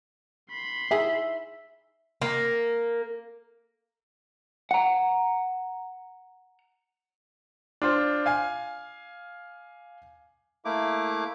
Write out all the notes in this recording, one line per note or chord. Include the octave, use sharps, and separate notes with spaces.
B5 C6
D#4 E4 G#4 E5
A#3
F#5 A#5
D4 F4 C5
F5 G#5
A3 A#3 E4 D6